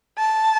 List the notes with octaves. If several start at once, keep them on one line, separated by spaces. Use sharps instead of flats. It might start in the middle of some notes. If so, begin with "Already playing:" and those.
A5